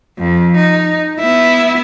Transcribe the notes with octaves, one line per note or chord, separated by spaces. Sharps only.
F2
D#4
B3 E4